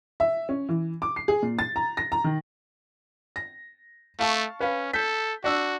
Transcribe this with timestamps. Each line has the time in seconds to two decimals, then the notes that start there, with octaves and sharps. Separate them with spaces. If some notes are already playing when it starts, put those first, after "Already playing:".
0.20 E5
0.49 C#4
0.69 E3
1.02 D6
1.16 C7
1.28 G#4
1.42 A#2
1.59 A6
1.76 A#5
1.97 A#6
2.12 A#5
2.24 D#3
3.36 A#6
4.19 A3 F5 A5 C#6
4.60 C#4 B4 F5
4.93 A4 G6 B6
5.44 D4 F#4 E6